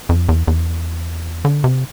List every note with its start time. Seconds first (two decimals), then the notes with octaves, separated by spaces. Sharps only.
0.09 F2
0.29 E2
0.47 E2
1.45 D3
1.64 C3